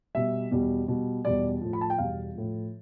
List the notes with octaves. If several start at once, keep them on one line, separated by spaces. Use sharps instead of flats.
B2 G3 E5
E2 B2 G3
B2 G3
E2 B2 G3 D5
A2 F3
B5
A5
G5
E2 B2 G3 F5
A2 F3